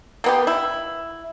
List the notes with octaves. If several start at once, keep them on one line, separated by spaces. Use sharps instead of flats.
A#3 B3 G4
E4